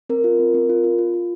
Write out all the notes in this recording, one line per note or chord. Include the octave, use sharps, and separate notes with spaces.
C4 A#4
F4
C4
C4
F4
F4
F4
F4